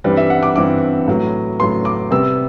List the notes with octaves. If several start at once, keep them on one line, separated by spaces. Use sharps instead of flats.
G2 E3 G3 C4 B4
E5
F#5
D6
G2 E3 G3 C4 D6
A2 F#3 B3
A2 F#3 B3 C6
D6
C3 G3 B3 E6